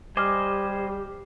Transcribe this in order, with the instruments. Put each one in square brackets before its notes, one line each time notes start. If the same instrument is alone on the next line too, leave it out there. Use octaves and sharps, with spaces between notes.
[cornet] G3 [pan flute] G4 [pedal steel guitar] C5 D#5 G#5 [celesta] D6 F6